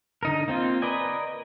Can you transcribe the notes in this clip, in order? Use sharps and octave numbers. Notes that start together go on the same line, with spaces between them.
D3 D#4 A#4
A#3 C4 F4
A#4 B4 D5 D#5 G#5